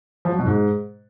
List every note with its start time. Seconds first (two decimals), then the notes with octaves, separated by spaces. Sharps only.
0.25 F3
0.32 F#3
0.39 B2
0.45 G#2